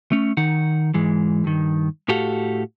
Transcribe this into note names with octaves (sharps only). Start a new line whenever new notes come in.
A3 C#4
D#3 D#4 F#5
G#2 E3 G#3
G2 D#3
A2 F#4 G4 A4 F5 F#5